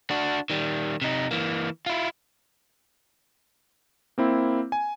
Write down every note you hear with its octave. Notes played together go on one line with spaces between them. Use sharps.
D4 F#4
D#3 G3
C3 D#4
E3 A#3
E4 F4
A#3 C4 E4
G#5